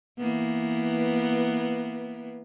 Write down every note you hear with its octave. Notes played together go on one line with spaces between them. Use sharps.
E3 A#3 B3